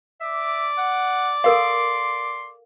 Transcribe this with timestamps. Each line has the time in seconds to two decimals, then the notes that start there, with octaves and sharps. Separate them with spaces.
0.20 D5 E5 D6
0.78 F#5
1.44 A4 A#4 F5 C6